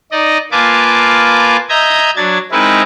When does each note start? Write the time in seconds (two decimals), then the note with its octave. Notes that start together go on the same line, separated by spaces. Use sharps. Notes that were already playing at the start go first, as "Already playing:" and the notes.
0.12 D#4 D5 D#5
0.52 A#3 F4 B4 G#5 A5 D6
1.69 D#5 E5 A#5 G6 G#6
2.16 F#3 D4 G#6 A6
2.52 G#3 C4 D#4 E4 A#4 B4